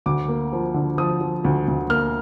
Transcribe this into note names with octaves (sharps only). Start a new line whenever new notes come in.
D2 D6
A#3
F3
D3
F3 D#6
F3
D2
D2
A#3 F6